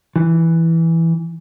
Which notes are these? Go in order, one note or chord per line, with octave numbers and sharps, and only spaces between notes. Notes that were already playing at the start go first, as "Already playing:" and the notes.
E3